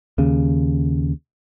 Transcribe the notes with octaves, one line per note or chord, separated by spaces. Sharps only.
D#2 C#3